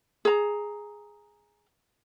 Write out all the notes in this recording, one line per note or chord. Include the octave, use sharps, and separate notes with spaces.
G#4 A#5